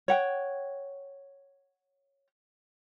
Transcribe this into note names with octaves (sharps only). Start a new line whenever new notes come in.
C#5 F#5 G5